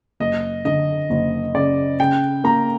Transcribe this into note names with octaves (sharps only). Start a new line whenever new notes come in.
F#1 D#5
D3 D#5
F#1
C#3 D5
C#3 G5
A#3 A#5